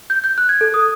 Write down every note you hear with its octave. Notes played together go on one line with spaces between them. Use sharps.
G6
G6
F#6
G#6
A4
D#6